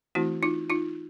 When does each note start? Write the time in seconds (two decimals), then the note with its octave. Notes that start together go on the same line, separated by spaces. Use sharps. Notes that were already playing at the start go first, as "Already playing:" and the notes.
0.15 E3 A3 C4 E4 F#4
0.43 D#4 F4
0.70 D#4 F4